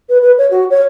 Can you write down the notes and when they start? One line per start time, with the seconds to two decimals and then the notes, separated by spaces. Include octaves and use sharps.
0.09 B4
0.22 B4
0.38 C#5
0.50 F#4
0.70 C#5